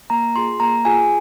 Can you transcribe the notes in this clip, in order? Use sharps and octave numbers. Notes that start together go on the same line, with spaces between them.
A#3 A#5
F4 G#4 C6
A#3 A#5
F4 G#4 G#5